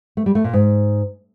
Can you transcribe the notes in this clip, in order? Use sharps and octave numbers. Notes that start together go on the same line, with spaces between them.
A3
G3
A3
A#2
G#2